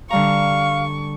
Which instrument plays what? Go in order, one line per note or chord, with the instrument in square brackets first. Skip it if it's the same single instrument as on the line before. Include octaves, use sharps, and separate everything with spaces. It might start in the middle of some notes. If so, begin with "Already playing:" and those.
[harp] D3 G3 A#5 [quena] F5 [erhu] C#6